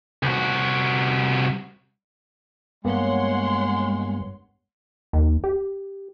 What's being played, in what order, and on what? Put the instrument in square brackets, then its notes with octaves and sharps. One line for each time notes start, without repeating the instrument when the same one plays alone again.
[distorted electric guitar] C2 F#4
[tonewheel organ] G2 [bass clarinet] G#3 [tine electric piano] A#3 B3 [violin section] C#5 F#5 C6
[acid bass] D#2
G4